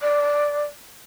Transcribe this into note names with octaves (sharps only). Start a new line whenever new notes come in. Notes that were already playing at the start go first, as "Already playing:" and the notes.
D5